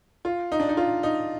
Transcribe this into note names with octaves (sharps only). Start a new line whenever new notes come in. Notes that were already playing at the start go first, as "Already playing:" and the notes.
F4
D#4
D4
D#4
F4
D#4